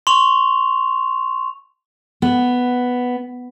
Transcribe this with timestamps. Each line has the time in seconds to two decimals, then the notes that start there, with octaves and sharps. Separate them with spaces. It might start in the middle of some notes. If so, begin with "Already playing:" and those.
0.07 C6 C#6 F7
2.22 B3